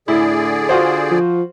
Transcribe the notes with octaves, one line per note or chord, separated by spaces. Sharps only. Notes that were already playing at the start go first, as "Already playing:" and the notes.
A2 D3 E4 G#4 D5
F4 F#4 C5
F3